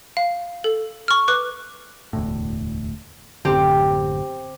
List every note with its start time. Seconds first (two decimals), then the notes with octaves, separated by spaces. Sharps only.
0.17 F5
0.64 A4
1.08 C#6 F6
1.28 B4 D6 F#6
2.13 E1 D2 A2
3.45 A1 F#2 D3 C4 G4